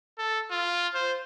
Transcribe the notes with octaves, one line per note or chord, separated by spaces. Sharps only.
A4
F4
C5